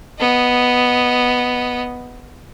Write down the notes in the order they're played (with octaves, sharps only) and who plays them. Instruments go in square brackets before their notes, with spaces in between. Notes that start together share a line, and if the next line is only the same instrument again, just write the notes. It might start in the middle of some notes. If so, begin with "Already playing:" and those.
[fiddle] B3 D#5